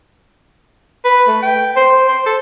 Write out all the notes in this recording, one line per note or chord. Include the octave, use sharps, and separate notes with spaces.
B4
A3
G5
C5
C5
A4